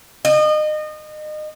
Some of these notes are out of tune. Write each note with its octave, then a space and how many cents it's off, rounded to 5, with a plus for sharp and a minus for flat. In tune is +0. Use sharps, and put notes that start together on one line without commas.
D#5 -30